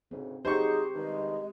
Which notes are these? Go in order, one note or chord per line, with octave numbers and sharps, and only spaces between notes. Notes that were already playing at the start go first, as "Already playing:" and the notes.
D2 G#2 C#3 C4
F#3 D#4 G4 G#4 C5 C#6
G2 D#3 G#3